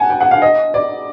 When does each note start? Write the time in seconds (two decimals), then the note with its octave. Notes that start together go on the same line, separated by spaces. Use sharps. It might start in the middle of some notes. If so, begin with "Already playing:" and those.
Already playing: F#5 G#5 A5
0.10 G5
0.20 F#5
0.31 F5
0.42 D#5
0.74 D5